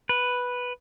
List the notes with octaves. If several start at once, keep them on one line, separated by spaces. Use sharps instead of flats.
B4